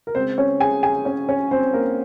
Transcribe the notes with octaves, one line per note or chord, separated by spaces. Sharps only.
A#4
C#3 G#3 C4 C5
C#4 C#5
G#4 G#5
G#4 G#5
C#4 C#5
C#4 C#5
C4 C5
A#3 A#4